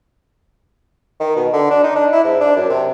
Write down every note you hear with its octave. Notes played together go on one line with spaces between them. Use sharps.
D#3
B2
D3
D4
D#4
D4
E4
G#2
D4
F#2
C3